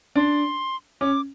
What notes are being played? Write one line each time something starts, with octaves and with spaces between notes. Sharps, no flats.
D4 C6
C#4 D6